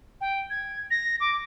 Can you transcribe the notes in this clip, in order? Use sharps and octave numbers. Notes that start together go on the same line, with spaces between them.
G5
G#6
A#6
D6